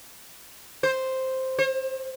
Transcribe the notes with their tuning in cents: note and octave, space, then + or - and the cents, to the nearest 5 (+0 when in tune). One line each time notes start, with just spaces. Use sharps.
C5 +0
C5 +40